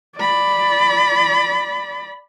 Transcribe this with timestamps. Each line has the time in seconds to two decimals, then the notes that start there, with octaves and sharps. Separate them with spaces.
0.16 D5 B5